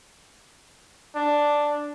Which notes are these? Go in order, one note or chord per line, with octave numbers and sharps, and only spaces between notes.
D4